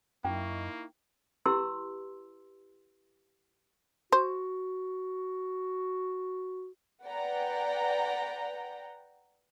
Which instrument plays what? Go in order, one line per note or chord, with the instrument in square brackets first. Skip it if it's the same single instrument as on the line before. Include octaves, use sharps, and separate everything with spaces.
[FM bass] F#2 [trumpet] A#3 [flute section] D#4 E4 C#6 [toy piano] G5
[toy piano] E4 G4 B4 C6 E6
[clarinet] F#4 [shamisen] C5
[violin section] B4 D5 F#5 G5 A#5